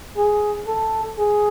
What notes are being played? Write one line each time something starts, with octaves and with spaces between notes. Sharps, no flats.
G#4
A4
G#4